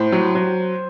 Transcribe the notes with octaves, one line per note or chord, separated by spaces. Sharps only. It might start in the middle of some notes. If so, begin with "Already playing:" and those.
Already playing: A2 C5
F#3
F#3